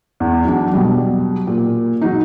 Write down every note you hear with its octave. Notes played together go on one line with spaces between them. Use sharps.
E2
F#3 D4
B2 F#3 G3
A#2
F#3 D#4